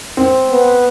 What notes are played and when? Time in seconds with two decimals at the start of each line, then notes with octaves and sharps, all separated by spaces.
0.17 C4
0.51 B3